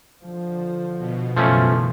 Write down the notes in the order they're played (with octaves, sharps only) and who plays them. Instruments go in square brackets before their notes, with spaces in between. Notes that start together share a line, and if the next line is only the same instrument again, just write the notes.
[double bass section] D3 F3
[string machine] B2
[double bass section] F#2 C#3 E3 [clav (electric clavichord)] F3 A3 C#4